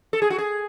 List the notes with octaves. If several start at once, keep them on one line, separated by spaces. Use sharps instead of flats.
A4
G#4
F#4
G#4